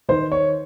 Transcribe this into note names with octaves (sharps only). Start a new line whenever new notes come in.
D#3 C5
C#5